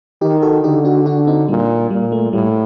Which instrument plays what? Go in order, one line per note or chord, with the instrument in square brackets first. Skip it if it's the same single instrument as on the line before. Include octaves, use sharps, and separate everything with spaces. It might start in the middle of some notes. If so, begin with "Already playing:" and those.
[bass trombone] D#3 [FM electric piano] D#4 G4
[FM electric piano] F#4 A4
[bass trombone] D3 [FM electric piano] D#4 G4
[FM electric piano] D4 F#4
D4 F#4
C4 D#4
[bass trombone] A#2 [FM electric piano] G3
[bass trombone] A#2 [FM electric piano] G3
[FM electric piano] A3
[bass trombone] A2 [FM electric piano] G3